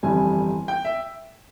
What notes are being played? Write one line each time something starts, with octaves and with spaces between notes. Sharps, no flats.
G1 F2 E3 G3 G#5
G5
E5